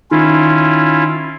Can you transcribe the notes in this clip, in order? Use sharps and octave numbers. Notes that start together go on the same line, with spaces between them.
D#3 C#4 E4 F4